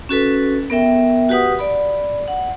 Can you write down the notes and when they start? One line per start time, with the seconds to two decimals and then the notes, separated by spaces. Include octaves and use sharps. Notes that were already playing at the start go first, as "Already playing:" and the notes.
0.09 C#4 F#4 A4 B4
0.70 B3 A#4 E5 G5
1.29 F#4 G4 B4 F#5 D#6
1.59 D5 B5
2.28 F#5